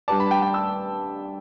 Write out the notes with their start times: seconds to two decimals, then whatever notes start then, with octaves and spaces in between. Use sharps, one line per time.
0.08 G3 D4 G4 B4 D5 A5
0.20 B5
0.31 G5
0.42 G5
0.54 E6